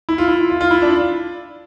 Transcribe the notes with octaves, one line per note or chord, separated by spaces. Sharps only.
E4
F4
E4
F4
F4
E4
D4